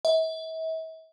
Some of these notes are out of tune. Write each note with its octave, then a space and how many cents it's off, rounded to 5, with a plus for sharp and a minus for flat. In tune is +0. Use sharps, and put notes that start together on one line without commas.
E5 -40